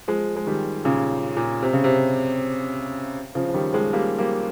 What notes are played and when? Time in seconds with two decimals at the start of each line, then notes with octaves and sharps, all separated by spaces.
0.08 F3 G#3
0.36 G#3
0.47 D#3 G3
0.85 A#2 C#3
1.37 A#2
1.62 C3
1.73 C#3
1.84 C3
3.35 C#3 F3
3.49 F3
3.54 D#3 G3
3.73 F3 G#3
3.93 G3 A#3
4.19 G3 A#3